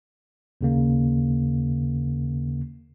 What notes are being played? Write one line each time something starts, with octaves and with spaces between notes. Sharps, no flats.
D#2 C#3 A#3